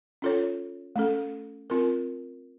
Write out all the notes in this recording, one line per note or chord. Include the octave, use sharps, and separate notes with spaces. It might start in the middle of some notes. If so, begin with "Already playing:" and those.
C#4 F4 A4 C#5
A3 C#4 A4
C4 F4 A#4